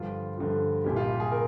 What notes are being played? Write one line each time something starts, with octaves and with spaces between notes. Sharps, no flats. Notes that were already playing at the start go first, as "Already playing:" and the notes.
Already playing: G2 D3 F3 F4
G2 D3 F3
C2 A#2 G3 G4
F4
G4
G#4
A#4